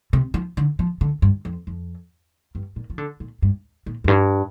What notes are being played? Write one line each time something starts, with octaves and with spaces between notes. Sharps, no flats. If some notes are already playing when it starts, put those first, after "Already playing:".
C3
F3
D3
F3
D3
G2
F2
F2
G2
A#2
F3
D3
A#2
G2
A#2
F2
G2